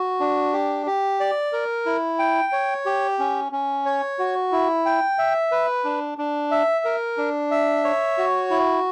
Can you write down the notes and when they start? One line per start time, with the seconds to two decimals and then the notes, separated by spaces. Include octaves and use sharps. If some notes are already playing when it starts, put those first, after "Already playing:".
Already playing: F#4
0.20 D4
0.53 G4
0.87 G4
1.20 D5
1.53 A#4
1.86 E4
2.19 G5
2.52 C#5
2.86 G4
3.19 C#4
3.52 C#4
3.86 C#5
4.19 F#4
4.52 E4
4.86 G5
5.18 E5
5.51 B4
5.85 D4
6.18 D4
6.51 E5
6.85 A#4
7.18 D4
7.51 E5
7.84 C#5
8.18 F#4
8.50 E4